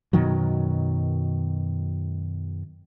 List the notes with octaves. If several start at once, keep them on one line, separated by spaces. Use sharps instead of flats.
F#2 B2 D#3 F#3